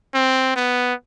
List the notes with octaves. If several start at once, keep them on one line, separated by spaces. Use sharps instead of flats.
C4
B3